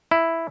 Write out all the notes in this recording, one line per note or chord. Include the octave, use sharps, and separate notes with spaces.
E4